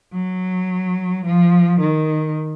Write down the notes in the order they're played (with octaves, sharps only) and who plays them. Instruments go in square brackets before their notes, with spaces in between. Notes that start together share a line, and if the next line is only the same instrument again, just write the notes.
[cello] F#3
F3
D#3